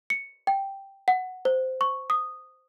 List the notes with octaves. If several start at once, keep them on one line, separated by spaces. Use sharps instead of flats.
C#7
G5
F#5
C5
C#6
D#6